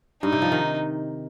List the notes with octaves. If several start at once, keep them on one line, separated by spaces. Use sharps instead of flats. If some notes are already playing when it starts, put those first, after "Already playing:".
G2 D#4
C3
F3
D#3